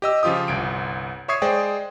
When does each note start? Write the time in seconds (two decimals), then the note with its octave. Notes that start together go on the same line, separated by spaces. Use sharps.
0.02 G4 D#5 E6
0.23 C#3 F3 F4 G4 D#6
0.48 G1 C2 D7
1.28 C#5 E5 C#6 D#6 G#6 C7
1.42 G#3 G#4 C5 D5 G5